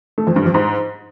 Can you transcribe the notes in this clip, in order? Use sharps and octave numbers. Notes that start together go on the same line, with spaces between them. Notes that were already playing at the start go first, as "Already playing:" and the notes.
A3
F2
G2
F2
G#2